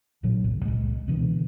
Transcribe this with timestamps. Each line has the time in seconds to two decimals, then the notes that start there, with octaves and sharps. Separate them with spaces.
0.23 A1 A#2 D3 F#3
0.44 G1 C2 G2
0.65 C#2 A#2 G#3
1.08 B2 D3 E3 B3